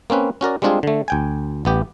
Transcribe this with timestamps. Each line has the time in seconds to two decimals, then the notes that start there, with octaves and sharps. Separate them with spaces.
0.10 A#3 C4 C#4 B4
0.41 C#4 F#4 A#4 D5
0.62 G3 G#3 C4 D4 F4 G#4
0.83 D3 A3
1.08 D2 G5 G#5
1.65 A1 B3 G4